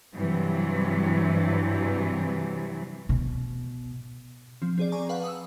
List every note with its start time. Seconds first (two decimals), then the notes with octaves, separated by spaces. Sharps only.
0.14 G2 C3 E3 F#3
3.09 B2
4.62 F3 C4
4.78 C4 G#4 D5
4.92 G#5 A#5 C#6 D6
5.09 B4 F5 F#5 A5 B5
5.24 D#6 E6